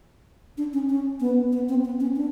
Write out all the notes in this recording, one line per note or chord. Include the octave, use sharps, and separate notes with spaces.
D4
C#4
C#4
B3
B3
C4
B3
C#4
D4